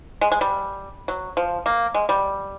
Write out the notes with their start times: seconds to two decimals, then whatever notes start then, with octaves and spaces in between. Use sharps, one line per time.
0.21 G#3
0.32 G#3
0.41 G3
1.08 F#3
1.37 F3
1.66 A#3
1.94 G#3
2.09 G3